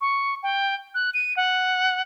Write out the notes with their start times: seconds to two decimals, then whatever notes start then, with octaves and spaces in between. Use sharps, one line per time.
0.01 C#6
0.43 G5
0.95 F#6
1.14 D#7
1.37 F#5